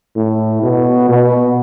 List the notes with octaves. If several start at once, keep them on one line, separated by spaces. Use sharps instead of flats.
A2
B2
B2